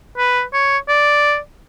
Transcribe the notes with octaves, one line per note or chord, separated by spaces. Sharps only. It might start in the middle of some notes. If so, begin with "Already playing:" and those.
B4
C#5
D5